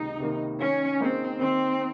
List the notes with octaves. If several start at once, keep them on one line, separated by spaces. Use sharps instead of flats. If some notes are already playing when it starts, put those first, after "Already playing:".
Already playing: C#2 C3 D#3 A#3 D#4
C3 D#3 A#3
D#3 C#4
A#3 C4 D#4 G#4 C5
D#3 C4